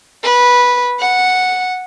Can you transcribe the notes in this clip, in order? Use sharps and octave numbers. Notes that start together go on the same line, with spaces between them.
B4
F#5